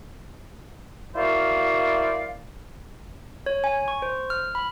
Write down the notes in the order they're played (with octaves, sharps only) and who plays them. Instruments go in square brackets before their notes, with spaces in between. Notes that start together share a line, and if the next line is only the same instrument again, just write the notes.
[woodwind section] E4 F#4 A#4 C5 D5 F5
[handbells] C#5
G#5
C#6
C5
F6
B5